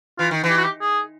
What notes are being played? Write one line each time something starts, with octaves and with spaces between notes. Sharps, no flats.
E3 F4
D#3
E3
G4
F#4
G4
G#4